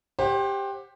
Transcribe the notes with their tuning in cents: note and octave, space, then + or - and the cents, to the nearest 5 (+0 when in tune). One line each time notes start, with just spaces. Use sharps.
G4 +10 C5 +30 F#5 +0